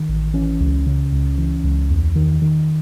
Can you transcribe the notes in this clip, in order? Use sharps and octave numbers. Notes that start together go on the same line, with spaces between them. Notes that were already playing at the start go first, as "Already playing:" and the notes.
Already playing: D#3
A1
E3 C#4
C#2
C#3
C#2
E3
C#2
E2
D#3
D#3